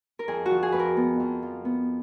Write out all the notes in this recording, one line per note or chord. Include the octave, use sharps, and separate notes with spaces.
A#4
F2 G#4
F#4
F3
G#4
F2 B4
A#4
B3
F2
F3
B3